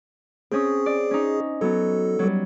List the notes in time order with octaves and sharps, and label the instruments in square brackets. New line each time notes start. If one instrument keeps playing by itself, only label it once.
[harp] C4 C#4 D#6 [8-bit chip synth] G#4
[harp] D5
C#4 D#4
[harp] F#3 B3 [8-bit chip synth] A4
[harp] F#3 G3